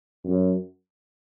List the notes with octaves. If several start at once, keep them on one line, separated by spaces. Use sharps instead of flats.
F#2